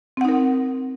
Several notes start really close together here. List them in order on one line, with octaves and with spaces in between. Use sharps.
C4 F#5 D#4 A#4